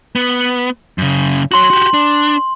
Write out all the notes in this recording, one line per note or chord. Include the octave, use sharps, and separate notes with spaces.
B3
F#2 C#3
F#4 C#5 C6 F#7
F#4 G4
D4